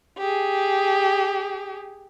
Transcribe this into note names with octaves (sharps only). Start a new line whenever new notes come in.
G4 G#4